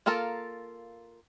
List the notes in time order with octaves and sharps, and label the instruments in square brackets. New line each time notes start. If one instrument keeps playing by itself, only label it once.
[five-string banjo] A#3 F4 A4 A#4